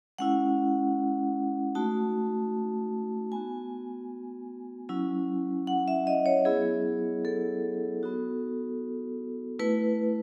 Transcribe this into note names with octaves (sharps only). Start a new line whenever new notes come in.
G#3 C#4 E4 F#5
A3 D#4 F#4 A5
B3 F#4 G#5
F#3 C#4 E4
F#5
E5
D#5
C#5
F#3 B3 E4 G#4
A4
B3 D#4 F#4
A3 E4 B4